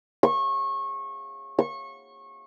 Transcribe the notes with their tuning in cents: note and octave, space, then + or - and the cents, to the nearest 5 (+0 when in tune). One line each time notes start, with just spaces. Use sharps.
C#6 -25
C#6 -25